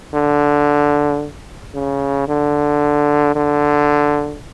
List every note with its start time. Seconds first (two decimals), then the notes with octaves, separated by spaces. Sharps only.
0.14 D3
1.74 C#3
2.28 D3
3.35 D3